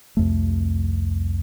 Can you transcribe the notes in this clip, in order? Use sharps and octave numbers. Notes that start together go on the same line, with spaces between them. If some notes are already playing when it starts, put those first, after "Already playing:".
C2 F2 A3